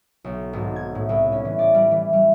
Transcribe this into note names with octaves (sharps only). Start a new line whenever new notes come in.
B1
G#1
G#6
A2
C2
C#4
E3
D5
G3
E3
G3